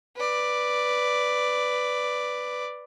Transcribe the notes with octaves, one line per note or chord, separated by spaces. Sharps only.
B4 D5